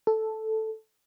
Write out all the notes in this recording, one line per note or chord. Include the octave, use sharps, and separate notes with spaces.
A4